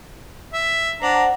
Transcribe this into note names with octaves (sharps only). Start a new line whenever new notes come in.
E5
D4 C5 F#5 A#5